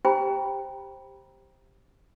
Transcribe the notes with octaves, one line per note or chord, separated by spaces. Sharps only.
G4 C5 G5 A#5 B5